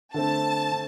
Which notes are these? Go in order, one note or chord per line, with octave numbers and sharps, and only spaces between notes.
D3 A3 C4 A5
D3